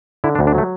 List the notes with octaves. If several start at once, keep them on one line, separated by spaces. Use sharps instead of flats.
D3 E4
D4
D2
D4
F#3 A3